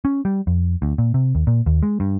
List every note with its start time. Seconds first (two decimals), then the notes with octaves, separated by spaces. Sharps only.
0.05 C#4
0.25 G3
0.47 F2
0.82 D2
0.98 A#2
1.14 C3
1.35 D#2
1.47 A#2
1.66 D#2
1.83 G#3
2.00 G2